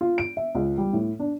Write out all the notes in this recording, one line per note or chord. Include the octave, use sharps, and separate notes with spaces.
F4
D7
E5
C#2
G3
A2
D4